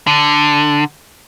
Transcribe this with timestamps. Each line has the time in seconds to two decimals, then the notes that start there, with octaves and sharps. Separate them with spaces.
0.07 D3